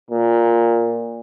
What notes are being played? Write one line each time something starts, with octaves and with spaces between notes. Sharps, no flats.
A#2